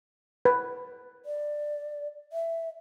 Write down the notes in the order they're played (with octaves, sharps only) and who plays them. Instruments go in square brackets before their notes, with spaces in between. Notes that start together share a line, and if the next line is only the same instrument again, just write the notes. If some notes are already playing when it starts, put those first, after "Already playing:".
[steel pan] B4
[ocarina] D5
E5